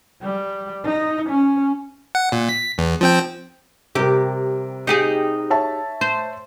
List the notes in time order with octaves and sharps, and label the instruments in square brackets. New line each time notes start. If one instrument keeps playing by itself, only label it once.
[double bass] G3
D#4
C#4
[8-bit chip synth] F#5
A#2
B6
E2
F3 C4 G5
[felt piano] C3 G3 A#4 [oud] G4
[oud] D#4 G4 G#4
[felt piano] C#5 E5 A5
[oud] C5